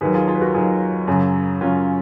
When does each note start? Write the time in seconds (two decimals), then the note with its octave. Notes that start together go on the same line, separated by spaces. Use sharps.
0.01 D#2 D#3 F#3 G#4 B4
0.14 F4 G#4
0.27 F4 G#4
0.35 B4
0.41 F#4 A#4
0.54 D#2 D#3 F#3 F4 G#4
1.08 F#2 C#3 F#3
1.61 F#2 C#3 F#3 C#4 F4